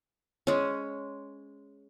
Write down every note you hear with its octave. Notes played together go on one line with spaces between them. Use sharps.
G#3 C#4